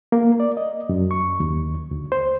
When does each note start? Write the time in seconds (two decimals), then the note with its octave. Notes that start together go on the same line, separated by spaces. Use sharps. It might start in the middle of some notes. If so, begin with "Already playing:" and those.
0.12 A#3
0.40 D5
0.57 D#5
0.89 F#2
1.11 C#6
1.40 D#2
1.91 D2
2.12 C5